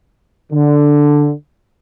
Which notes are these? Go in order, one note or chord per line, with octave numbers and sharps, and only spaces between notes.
D3